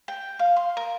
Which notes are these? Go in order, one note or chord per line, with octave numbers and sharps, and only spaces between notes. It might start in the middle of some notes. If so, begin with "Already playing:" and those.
G5
F5
C6
A#4